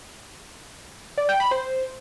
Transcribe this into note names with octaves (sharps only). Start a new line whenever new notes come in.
D5
G5
B5
C5